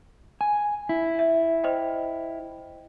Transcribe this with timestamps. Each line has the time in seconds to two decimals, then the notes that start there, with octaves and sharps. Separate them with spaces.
0.41 G#5
0.89 E4
1.19 E5
1.64 C5 D#5 G5